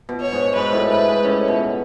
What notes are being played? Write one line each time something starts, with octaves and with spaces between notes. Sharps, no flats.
B2
C#5
G#2
G#2 B4
A2
G#2 B4
G#2
A2 C#4
B2